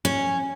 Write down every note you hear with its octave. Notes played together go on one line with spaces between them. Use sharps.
C#4